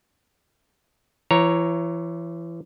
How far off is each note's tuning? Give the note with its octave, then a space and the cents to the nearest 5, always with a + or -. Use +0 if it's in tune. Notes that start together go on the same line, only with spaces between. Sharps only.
E3 +30 C#5 +0 A#5 +0